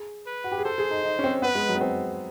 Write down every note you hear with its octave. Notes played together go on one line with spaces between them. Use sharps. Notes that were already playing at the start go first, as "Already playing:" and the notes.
Already playing: G#4
B4
F#4
G4
G#4
A4 C5
G#4
D#4
D#4
C#4
C4
B3 B4
G#3
F#3
B3
C4